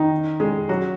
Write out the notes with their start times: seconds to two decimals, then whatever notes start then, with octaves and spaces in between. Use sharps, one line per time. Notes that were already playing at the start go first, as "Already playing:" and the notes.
Already playing: D#3 D#4
0.40 G#3 G#4
0.69 F#3 F#4